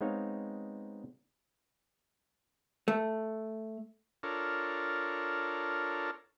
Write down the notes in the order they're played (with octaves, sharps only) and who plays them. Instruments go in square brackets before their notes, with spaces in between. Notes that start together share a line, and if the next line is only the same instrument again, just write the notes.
[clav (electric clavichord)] G#3 B3 C4 D#4 C#5 F5
[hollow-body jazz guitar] A3
[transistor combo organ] D4 F4 A4 A#4 C#5